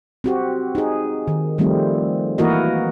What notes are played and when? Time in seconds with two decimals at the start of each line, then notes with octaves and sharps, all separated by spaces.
0.24 C4 F#4 G4
0.75 D#4 G#4
1.28 D#3
1.58 D#3 F3 G3 A3 C4
2.38 E3 A#3 E4 F#4 A#4 D#5